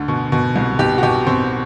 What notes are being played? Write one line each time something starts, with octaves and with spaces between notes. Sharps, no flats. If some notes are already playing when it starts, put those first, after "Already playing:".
Already playing: D2 D3
B2
B2
C2
B2 G4
F#4
B2 G4
B2 C4